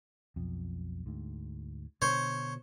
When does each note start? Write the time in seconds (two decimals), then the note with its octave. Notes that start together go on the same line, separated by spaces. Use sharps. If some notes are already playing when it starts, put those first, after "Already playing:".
0.36 B1 F2
1.06 D2 G#2
2.02 B2 D3 C5 C#5